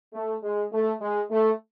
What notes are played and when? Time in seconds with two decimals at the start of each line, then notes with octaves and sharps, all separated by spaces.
0.14 A3
0.43 G#3
0.72 A3
1.01 G#3
1.31 A3